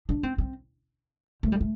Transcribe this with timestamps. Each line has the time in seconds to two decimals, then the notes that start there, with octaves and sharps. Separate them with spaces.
0.09 D4
0.23 C4
0.38 C4
1.43 A3
1.52 G3
1.60 A3